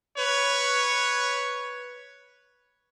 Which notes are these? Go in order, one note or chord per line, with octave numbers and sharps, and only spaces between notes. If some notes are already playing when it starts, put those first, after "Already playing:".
B4 C#5